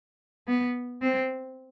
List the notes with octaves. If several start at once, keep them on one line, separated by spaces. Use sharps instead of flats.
B3
C4